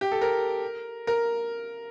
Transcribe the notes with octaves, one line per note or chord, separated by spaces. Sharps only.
G4
A4
A#4
A#4